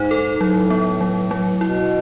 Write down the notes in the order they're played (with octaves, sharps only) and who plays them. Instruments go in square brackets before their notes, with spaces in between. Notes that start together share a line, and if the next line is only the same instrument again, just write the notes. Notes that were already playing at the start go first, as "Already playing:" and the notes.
Already playing: [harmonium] G#2 [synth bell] D#4
[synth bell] A4
[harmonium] A2 [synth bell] F#3
[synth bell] B3
F#3
F#3
[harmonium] B2 [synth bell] E4